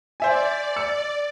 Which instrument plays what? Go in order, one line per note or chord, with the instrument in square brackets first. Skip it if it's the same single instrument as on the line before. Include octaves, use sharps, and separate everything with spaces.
[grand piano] C5 E5 G#5 [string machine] D5
[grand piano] E6 C#7